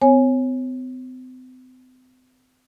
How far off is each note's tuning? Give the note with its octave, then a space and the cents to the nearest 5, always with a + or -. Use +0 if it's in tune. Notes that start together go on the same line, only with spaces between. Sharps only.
C4 -45 C#5 -20 G#5 +0